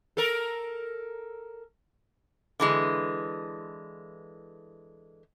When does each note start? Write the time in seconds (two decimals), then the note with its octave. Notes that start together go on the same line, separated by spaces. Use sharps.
0.17 A4 A#4
2.60 D3 E3 G#3